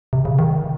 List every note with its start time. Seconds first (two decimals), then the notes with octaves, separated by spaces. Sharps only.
0.13 C3
0.25 C#3
0.39 D#3